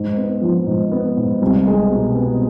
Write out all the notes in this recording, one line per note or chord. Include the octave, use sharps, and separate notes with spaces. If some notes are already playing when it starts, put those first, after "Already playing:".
Already playing: G#2
B3
F3
G#2
B3
G#2
C2
G#3
B2
B3